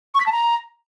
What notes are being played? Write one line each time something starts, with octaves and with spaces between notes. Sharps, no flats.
C#6
B6
A5
A#5